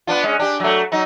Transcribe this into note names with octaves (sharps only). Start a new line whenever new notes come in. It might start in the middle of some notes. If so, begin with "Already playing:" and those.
B3 D4 F4
G#3 C#4
D4 G4
F#3 A3
F#3 D#4